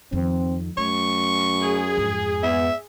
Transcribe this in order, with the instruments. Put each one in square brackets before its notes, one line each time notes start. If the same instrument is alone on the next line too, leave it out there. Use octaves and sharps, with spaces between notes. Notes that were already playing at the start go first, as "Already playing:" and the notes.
[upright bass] F2 D#3 [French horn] C4
[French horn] F#2 [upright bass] A3 [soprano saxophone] C#6
[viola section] G#4
[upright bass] F2 G#2
[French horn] B3 [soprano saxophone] E5